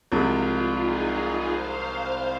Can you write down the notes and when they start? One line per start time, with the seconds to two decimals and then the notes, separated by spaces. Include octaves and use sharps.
0.12 C2 C3 F3 G#3 F4
0.80 D#4 G#4
1.50 C5 F5